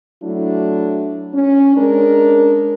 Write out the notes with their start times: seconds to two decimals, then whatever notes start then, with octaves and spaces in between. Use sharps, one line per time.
0.23 F#3 A3 D4 E4
1.34 C#4
1.76 G#3 C#4 D4 A#4